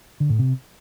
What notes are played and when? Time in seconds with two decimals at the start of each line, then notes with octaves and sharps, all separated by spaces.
0.20 D3
0.30 A2
0.39 C3